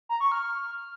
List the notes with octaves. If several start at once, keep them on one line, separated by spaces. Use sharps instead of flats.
A#5
C#6
F6